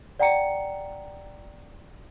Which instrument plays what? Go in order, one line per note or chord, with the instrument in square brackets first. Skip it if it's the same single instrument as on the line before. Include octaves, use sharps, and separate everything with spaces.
[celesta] D5 F#5 G5 A#5 C#7